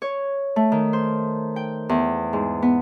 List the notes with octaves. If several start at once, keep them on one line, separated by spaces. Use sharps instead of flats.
C#5
A3
D#3
C5
G5
E2
G#2
B3